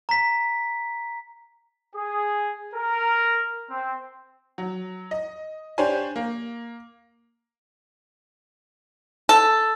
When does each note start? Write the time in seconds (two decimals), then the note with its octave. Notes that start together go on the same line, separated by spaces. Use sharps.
0.09 A#5 B6
1.94 G#4
2.74 A#4
3.70 C4
4.58 F#3
5.11 D#5
5.78 D4 G4 C5 C#5 G#5
6.16 A#3
9.29 A4